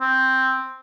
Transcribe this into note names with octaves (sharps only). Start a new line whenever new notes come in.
C4